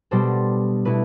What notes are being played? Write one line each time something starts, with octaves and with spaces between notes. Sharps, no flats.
B2 G3 D4 A4 C5
B2 A3 E4 B4